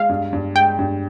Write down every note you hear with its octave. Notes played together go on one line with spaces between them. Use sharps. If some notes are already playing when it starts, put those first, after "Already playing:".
Already playing: G#3 F5
G2
G2
G#3 G5
G2